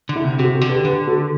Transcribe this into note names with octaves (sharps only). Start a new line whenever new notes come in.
D3
E4
C3
C3 F#4
F#4 A4
D3
G4 B4
D3 G4 B4
F#4 A4